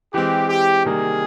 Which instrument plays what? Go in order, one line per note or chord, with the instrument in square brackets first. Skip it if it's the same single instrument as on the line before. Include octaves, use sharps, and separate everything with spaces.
[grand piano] E3 G#3 C4 [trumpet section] G4
[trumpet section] G4
[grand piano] C3 D#3 G3 A#3 D#4 [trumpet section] G#4